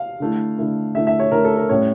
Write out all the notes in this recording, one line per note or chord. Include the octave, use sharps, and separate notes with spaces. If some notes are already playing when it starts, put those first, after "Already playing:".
Already playing: F5
D3 A3 E4
D3 A3 E4
D3 A3 E4 E5
E5
C#5
D3 A3 E4 A#4
A4
A#4
A2 G3 C#4 C#5